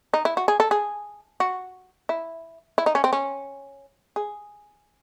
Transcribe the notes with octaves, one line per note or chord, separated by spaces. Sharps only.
D#4
E4
F#4
G#4
A4
G#4
F#4
E4
E4
D#4
C#4
C4
C#4
G#4